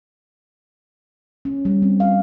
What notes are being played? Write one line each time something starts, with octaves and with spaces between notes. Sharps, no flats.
C#4
G3
C4
F5